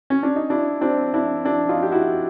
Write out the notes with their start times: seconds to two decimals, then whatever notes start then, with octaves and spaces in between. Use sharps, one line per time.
0.10 C#4
0.23 D4
0.36 D#4
0.50 D4 E4
0.81 C4 D4
1.14 D4 E4
1.45 D4 E4
1.69 D#4 F4
1.83 G4
1.92 E4 F#4